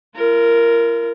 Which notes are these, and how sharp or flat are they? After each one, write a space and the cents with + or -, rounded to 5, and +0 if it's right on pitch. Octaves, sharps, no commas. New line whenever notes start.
F4 -45 A#4 +0